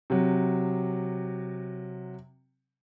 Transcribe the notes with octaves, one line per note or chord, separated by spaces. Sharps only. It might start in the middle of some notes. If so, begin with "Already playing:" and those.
C3 F#3